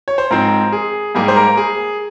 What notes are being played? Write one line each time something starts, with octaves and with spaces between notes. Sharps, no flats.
C#5
C5
G#2 F3 C4 A#4
G#4
G#2 G3 A#3 G#4
C5
A#4
G#4